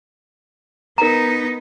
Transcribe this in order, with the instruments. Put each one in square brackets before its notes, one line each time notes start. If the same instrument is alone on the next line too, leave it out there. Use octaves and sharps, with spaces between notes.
[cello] B3 D#4 [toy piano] A#4 A#5